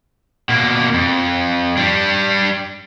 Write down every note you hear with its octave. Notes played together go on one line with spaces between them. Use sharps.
B2 A#3
F2
G3 D4